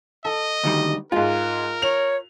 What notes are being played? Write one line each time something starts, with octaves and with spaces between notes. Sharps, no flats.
A4 D#5
D2 D#3 G3
G#2 G#3 F4 A#4
C#5 F7